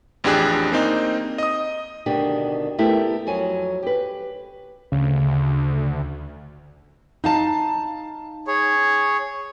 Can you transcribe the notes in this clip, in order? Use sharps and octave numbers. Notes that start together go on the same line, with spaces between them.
A1 F2 D4 G4 G#4 F#6
A#3 C4 D#4
D#5 D#6
D2 B2 D#3 D4 G4
A3 B3 E4 G4 A#4
F2 F#3 G#5
G4 B4
D2 C#3
D#4 F5 A5
G#4 C#5